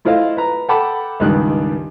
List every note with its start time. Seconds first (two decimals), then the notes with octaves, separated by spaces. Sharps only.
0.05 A3 E4 F4 C5 D#5 F5
0.37 B4 A#5
0.68 A4 F#5 G5 A5 B5 D6
1.20 C#2 G2 D#3 G3 F#6